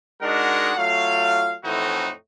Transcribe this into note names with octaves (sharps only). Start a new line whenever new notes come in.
G#3 D4 D#4 F#4 A#4 F#5
F#3 A3 F4 F5
F2 A2 E3 C4 D#4 F#4